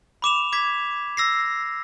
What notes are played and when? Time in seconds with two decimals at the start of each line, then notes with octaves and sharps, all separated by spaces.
0.22 B5 D6 E7 F7
0.52 D6 G#6 B6
1.17 E6 A#6 C7